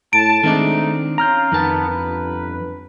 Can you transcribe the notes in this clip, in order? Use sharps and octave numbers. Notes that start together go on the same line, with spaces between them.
A2 A5 D7
D#3 G#3 A3 C4 D4 D#4
C#4 F4 A#5 F6 G6
F2 D#3 B3 A5
G1 B4